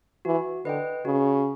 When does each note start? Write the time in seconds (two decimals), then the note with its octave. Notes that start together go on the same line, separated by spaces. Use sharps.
0.25 E3 F#4
0.65 D3 B4 D#5 G5
1.05 C#3 F#4